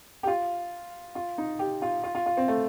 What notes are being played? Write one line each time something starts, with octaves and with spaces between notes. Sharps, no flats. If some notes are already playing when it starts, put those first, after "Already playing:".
G4
F4
F4
D#4
G4
F4
F4
F4
F4
C4
A3